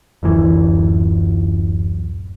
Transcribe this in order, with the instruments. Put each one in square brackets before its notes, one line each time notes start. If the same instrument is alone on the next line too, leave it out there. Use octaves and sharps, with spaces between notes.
[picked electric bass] D1 F#2 E3